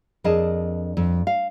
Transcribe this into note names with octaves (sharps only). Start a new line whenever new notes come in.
F2 D4 G#4 A#4 D#5 A5
F2
F5